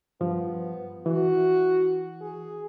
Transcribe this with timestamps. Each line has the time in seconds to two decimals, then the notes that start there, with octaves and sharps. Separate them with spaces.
0.21 G2 F3 B3
1.06 E3 F#4
2.21 G#4